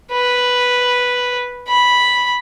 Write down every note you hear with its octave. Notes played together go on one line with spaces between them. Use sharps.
B4
B5